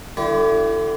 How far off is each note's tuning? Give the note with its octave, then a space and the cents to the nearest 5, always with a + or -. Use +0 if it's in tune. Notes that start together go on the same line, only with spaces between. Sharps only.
D3 +15 E4 +40 G4 -35